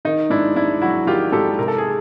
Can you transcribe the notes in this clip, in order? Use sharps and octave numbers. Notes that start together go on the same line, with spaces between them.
D#3 D#4
G#2 D4 E4
G#2 D4 E4
F#3 E4 F#4
D#3 F4 G4
G#2 G4 A4
C3 A#4
A4
G#4